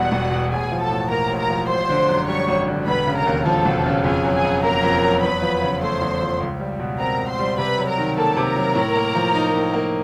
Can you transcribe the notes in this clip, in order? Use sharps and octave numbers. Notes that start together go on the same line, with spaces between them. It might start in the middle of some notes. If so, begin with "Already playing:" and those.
Already playing: E1 E2 B2 G3 F#4 F#5
E1
B2
A1 G#4 G#5
F3
A4 A5
A2
A#3 A#4 A#5
A1
A#4 A#5
F3
G#1 C5 C6
D3
F#2
G3 C#5 C#6
G#1
D3
E1 B4 B5
C#3
A#4 A#5
D#2
F3 A4 A5
E1
C#3
F2 G#4 G#5
F#3
G#4 G#5
C#3
A#3 A#4 A#5
F2
F#3
E2 B4 B5
F3
C#3
A3 C5 C6
E2
F3
C#2
G3
B2
C4 A#4 A#5
C#2
C5 C6
G3
C3 B4 B5
F#3
A#4 A#5
D#3
A#3 A4 A5
C3
A#4 A#5
F#3
A2
A#3
F3
D#4
A2
A#3